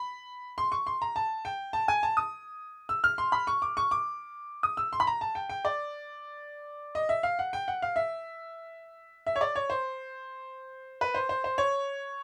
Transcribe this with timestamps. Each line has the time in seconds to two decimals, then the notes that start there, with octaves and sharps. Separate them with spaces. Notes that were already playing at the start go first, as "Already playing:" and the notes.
Already playing: B5
0.58 C6
0.72 C#6
0.87 C6
1.02 A#5
1.16 A5
1.45 G5
1.73 A5
1.88 G#5
2.03 A5
2.17 D#6
2.89 E6
3.04 F6
3.18 C6
3.32 B5
3.47 C#6
3.62 D6
3.77 C#6
3.91 D6
4.63 D#6
4.77 E6
4.93 C6
5.00 B5
5.07 A#5
5.21 A5
5.35 G5
5.50 G5
5.65 D5
6.95 D#5
7.09 E5
7.23 F5
7.39 F#5
7.53 G5
7.68 F#5
7.82 F5
7.96 E5
9.27 E5
9.36 C#5
9.41 D5
9.55 C#5
9.70 C5
11.01 B4
11.14 C5
11.29 C5
11.44 C5
11.58 C#5